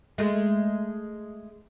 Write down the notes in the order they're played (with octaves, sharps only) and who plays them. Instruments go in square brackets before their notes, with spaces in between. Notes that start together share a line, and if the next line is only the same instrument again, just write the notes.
[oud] G#3 A3